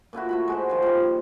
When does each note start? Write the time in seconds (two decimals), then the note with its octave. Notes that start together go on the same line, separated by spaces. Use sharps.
0.13 A#2 D3 E4 F#4
0.29 A3 F#4 B5
0.48 G#3 F#4 C5
0.70 D#3 F3
0.82 A#2 G3